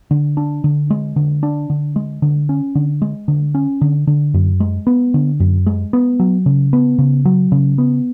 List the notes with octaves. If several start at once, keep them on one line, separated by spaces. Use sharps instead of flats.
D3
D4
D3
G#3
D3
D4
D3
G#3
D3
C#4
D3
G#3
D3
C#4
D3
D3
F#2
G#3
B3
D3
F#2
G#3
B3
F#3
C#3
B3
C#3
F#3
C#3
B3